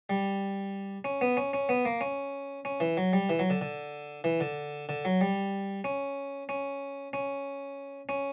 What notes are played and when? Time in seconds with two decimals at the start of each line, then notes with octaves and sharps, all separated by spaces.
0.10 G3
1.05 C#4
1.21 B3
1.37 C#4
1.54 C#4
1.69 B3
1.85 A#3
2.01 C#4
2.65 C#4
2.80 E3
2.97 F#3
3.13 G3
3.29 E3
3.39 F#3
3.50 D3
3.61 D3
4.24 E3
4.41 D3
4.89 D3
5.05 F#3
5.21 G3
5.84 C#4
6.49 C#4
7.13 C#4
8.09 C#4